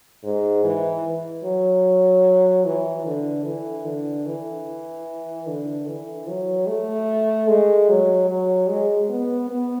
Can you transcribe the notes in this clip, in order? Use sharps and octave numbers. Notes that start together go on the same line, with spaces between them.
G#2
E3
F#3
E3
D3
E3
D3
E3
D3
E3
F#3
A3
G#3
F#3
F#3
G#3
B3
B3